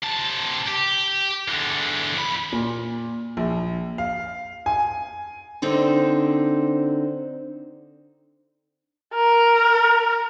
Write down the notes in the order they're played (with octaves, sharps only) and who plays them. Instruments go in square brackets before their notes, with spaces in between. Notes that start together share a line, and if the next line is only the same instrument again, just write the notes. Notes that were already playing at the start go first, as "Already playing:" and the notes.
[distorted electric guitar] C3 A5
G4
E2 D3
F2 B5
[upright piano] A#2
A#1
F5
G#5
[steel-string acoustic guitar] D3 C4 D#4 C5
[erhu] A#4